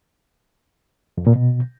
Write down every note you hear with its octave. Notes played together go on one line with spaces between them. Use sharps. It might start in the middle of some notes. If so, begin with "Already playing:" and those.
F2
A#2
B2